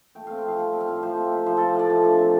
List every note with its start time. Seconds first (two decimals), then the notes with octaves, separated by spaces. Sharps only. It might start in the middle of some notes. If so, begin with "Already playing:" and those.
0.15 A3 G5
0.27 C4 F5
0.38 G5
0.45 F3 F5
0.59 G3 G5
0.73 C4
0.81 F5
0.88 A2
1.03 F3 C5
1.17 C4
1.32 C3
1.46 F3 C5
1.57 C4 A4
1.75 A2 D5
1.90 F3
2.04 D4
2.19 C3